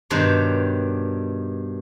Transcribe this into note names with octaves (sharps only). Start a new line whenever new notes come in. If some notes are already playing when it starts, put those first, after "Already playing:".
G2 B2 D#3 G4 C5 C#5